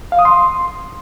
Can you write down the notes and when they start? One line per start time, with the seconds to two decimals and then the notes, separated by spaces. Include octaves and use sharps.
0.12 F5
0.19 D#6
0.25 C6